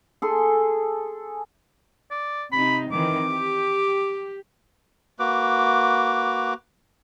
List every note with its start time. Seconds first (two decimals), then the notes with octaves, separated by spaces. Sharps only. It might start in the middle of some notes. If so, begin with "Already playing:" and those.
0.22 G#4 A4 C6
2.11 D5
2.52 C3 D#4 B5
2.92 D#3 E3 C4 D6
3.31 G4
5.19 A#3 F#4 B4 D6